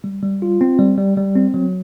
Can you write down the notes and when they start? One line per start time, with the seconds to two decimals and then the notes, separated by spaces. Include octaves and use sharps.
0.04 G3
0.23 G3
0.42 F4
0.61 C4
0.79 G3
0.98 G3
1.17 G3
1.36 C4
1.54 F#3